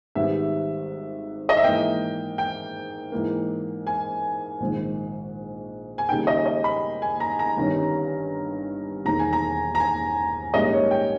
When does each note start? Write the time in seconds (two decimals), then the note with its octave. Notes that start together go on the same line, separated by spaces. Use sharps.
0.15 G#1 G#2 D#3 G3 B3 E5
1.49 D#5
1.57 E5
1.64 G#2 E3 A#3 G5
2.38 G5
3.12 G#2 E3 A#3
3.87 G#5
4.60 A#1 G#2 D#3
5.98 G#5
6.09 D#2 C#3 G3 A#3 D#4 G5
6.27 D#5
6.46 D#5
6.64 B5
7.02 G#5
7.20 A#5
7.39 A#5
7.57 G1 G2 D#3 G3 C#4
9.05 E1 D#2 D#3 A#5
9.19 G#5
9.33 A#5
9.75 A#5
9.80 G#5
10.54 A#1 G#2 G3 A#3 C#4 D#5
10.73 C#5
10.91 G5